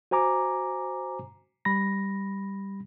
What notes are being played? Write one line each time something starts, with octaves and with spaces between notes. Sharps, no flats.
F#4 C5 G#5 A#5 D6
G3 B5 A#6